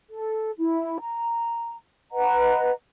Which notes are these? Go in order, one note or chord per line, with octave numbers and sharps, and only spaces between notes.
A4
E4
A#5
B4 D#5 F#5 A#5